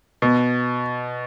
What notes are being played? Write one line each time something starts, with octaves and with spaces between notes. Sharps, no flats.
B2